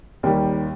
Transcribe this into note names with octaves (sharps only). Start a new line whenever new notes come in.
D#2 D#3 G3